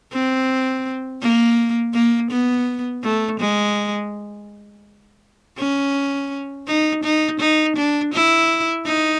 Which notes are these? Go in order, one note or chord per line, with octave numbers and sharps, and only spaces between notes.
C4
A#3
A#3
B3
A3
G#3
C#4
D#4
D#4
D#4
D4
E4
D#4